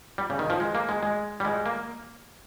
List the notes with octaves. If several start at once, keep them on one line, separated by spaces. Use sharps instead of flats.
G3
C#3
D#3
F3
G#3
A#3
G#3
G#3
G3
G#3
A#3